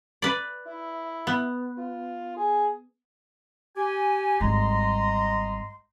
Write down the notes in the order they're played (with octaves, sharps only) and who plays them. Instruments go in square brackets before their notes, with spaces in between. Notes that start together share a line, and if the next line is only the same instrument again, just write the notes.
[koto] B4 D5
[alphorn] E4
[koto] B3
[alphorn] F4
G#4
[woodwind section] G4 G#5
[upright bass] G#1 G3 [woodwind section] D#5 A#5 C6